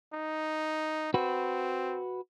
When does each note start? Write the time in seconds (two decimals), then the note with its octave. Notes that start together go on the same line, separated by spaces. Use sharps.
0.14 D#4
1.14 C4 F#4 B4